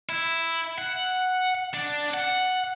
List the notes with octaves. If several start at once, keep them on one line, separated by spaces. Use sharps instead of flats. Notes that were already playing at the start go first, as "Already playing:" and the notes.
E4
F#5
D4
F#5